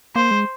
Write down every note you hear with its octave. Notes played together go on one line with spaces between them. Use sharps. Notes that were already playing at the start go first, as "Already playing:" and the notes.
A#3 C5
G#3